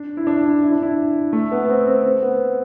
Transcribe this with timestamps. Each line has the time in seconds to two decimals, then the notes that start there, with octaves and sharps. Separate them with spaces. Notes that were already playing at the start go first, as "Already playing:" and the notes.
Already playing: D4
0.17 E4
0.27 D4
0.44 E4
0.62 E4
0.72 D4
0.82 E4
1.33 A3
1.52 B3
1.65 B3
1.69 C4
1.87 C4
2.05 C4
2.22 B3